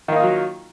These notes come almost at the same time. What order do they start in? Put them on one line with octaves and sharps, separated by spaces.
D#3 A#3 D#4 F4 F#3